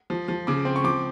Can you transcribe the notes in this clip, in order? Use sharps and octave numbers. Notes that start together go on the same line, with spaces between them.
F3
F3
C#3 D6
C4
C#6
F3 D6